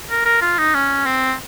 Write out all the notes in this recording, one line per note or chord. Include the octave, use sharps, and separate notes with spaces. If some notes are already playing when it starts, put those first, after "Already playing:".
A#4
A#4
F4
D#4
C#4
C4